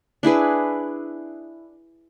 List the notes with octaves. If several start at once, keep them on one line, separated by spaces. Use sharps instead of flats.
D4 E4 G#4 B4